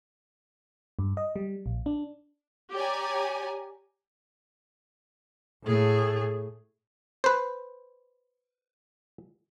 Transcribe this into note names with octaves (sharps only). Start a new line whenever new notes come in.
G2
D#5
G3
A#1
D4
G4 C#5 D5 G#5 A#5
A2 A3 G#4
B4 C5